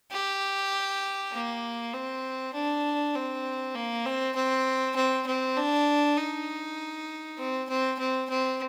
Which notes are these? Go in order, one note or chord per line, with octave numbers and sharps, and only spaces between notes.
G4
A#3
C4
D4
C4
A#3
C4
C4
C4
C4
D4
D#4
C4
C4
C4
C4